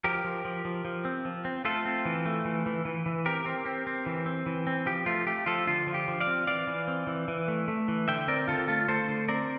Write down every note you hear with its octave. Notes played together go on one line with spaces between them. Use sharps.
F3 G4 A#4
F3
F3
F3
F3
C4
F3
C4
A3 F4 A4
C4
E3
A3
E3
E3
E3
E3
C4 G4 A#4
C4
C4
C4
E3
C4
E3
C4
F3 G4
A3 F4
A3 G4
F3 F4 A4
D3 F4
F3
G4
F3
D5 F5
C4
E3 D5 F5
E3
C4
E3
E3
A3
A3
E3
D3 E5 G5
C4 A#4 D5
D3 F4 A4
A3 F4 A4
A3 A4 C5
D3
C4 A#4 D5